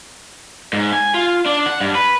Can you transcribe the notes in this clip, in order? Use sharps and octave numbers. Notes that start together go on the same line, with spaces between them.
G#2
G#5
F4
D4
F#5
G2
B4